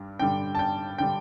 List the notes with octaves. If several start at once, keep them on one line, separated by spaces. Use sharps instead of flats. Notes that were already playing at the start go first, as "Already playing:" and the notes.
Already playing: G2 G3
G2 D3 G3 G5
A5
G5
D3 G3 G5